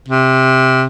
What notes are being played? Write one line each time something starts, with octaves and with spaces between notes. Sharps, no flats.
C3